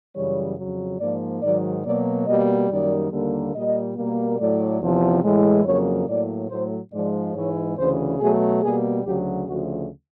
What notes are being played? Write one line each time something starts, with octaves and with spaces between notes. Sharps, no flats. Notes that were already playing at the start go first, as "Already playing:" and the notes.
F#2 C#3 E3 G3 C#5
F2 C#3 F#3
G#2 F3 A#3 D5
G#2 D#3 F#3 D5
B2 F#3 A#3 D5
B2 G3 A#3 D#5
F#2 D#3 G3 A#3 D5
D#2 D3 G3 A#3
A#2 G3 A#3 D#5
B2 G3 A#3
A2 F#3 A3 D5
E2 C3 F3
A2 E3 G#3
F2 C#3 F#3 A#3 C#5
A2 F#3 A#3 D5
A2 F#3 A3 C5
G#2 F3 G#3 D5
G#2 E3 G#3 C#5
D2 C#3 E3 C5
B2 F#3 A3 G#4
B2 G3 A#3 G#4
D2 C#3 F#3 G4
D2 C#3 F3 A3 F#4